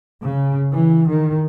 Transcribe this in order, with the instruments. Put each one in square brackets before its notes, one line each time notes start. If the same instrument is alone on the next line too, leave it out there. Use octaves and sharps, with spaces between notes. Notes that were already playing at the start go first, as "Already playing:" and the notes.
[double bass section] C#3
E3
D#3